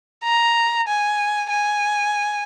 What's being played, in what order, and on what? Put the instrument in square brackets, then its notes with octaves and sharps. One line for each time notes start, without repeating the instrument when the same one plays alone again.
[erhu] A#5
G#5
G#5